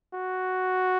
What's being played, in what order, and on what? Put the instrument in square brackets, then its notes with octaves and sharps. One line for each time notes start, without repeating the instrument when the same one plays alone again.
[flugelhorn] F#4